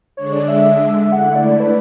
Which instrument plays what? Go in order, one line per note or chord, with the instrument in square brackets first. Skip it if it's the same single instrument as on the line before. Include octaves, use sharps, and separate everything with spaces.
[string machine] D3 G#3 D4 [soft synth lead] C#5
[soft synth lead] D5
E5
[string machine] D3 A3 E4 [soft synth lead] F#5
[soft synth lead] D5
B4